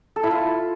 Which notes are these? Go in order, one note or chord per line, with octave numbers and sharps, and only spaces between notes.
A4
E4
F4